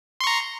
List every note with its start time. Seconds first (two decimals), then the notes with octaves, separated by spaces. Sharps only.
0.20 C6
0.24 C#6
0.27 A#5